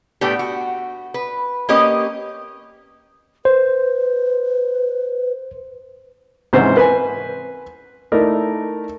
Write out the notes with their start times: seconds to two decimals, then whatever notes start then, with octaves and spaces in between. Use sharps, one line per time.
0.21 A2 A3 B3 D4 G4
0.39 F#4
1.14 B4
1.69 A#3 C#4 G4 B4 D#5
3.45 B4 C5
6.53 G#2 C3 E3 C#4 C5 F#5
6.77 B4 G#5
8.12 A3 D#4 E4 A#4 D5